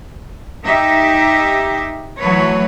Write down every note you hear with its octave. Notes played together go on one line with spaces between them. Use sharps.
D#4 G4 E5
E3 F#3 A3 B4 C#5